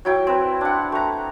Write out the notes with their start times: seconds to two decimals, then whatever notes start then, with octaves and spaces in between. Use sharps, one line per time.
0.05 F#3 E4 G5
0.27 C4 B4
0.61 D4 F#5
0.92 A3 A#5